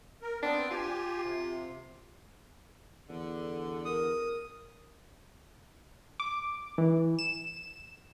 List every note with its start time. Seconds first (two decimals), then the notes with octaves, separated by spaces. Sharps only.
0.22 A#4
0.42 B3 C4 D4
0.70 F4 G4 G#5
1.22 C3
3.09 E2 D3
3.85 A#4 D#6
6.20 D6
6.78 E3
7.19 E7